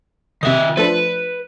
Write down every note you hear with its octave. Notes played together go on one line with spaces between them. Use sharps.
C3 D#3 D#5 E5
F3 A3 D4 B4